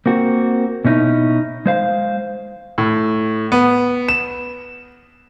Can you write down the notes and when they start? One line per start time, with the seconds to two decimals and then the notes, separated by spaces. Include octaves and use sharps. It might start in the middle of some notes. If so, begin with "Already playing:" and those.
0.06 A#3 C4 F#4
0.85 B2 C#4 D#4 E4
1.66 G#3 C5 F5
2.78 A2
3.52 B3
4.08 E7